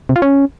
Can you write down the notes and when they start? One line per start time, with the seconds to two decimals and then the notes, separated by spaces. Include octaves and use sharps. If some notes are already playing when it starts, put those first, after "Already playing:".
0.09 C3
0.16 F4
0.22 C#4